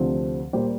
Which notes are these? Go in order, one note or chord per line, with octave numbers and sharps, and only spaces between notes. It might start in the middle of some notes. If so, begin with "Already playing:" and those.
Already playing: D2 C3 F3 C4
A#2 G3 A#3 G4 C5